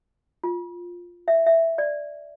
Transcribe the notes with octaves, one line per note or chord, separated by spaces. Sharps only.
F4
E5
E5
D5